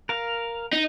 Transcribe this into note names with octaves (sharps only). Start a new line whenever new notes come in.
A#4 F5
D#4